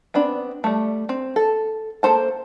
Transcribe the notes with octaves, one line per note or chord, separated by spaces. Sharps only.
B3 C4 D4 B5
G3 A3
C4
A4
A#3 A4 C5 A5